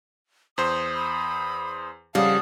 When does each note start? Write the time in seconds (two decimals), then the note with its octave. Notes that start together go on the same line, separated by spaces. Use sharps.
0.58 E2 C5 D#6
0.93 B5 E6
2.15 F2 C#3 G3 F5 F#5 A5 D#6